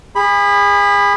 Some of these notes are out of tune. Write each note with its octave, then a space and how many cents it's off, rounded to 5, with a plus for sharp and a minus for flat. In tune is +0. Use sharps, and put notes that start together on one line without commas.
G#4 -35 B5 +0